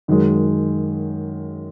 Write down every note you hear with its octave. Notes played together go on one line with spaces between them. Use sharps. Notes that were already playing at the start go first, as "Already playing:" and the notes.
F#2 D#3 G#3